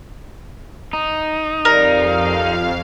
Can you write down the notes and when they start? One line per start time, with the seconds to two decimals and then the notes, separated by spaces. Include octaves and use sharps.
0.93 D#4
1.65 F2 G3 A#4 F5